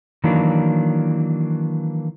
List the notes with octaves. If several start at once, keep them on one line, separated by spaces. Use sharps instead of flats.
D#3 E3 F#3 A#3 D4